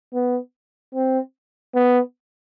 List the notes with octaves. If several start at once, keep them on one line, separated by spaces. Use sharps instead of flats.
B3
C4
B3